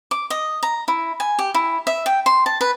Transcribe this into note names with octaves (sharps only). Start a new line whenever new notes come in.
D6
D#5
A#5
E4
G#5
G4
E4
E5
G5
C6
A5
B4